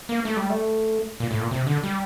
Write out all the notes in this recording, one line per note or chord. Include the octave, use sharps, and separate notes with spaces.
A#3
A3
G3
A3
A#2
A2
A#2
C3
D3
G3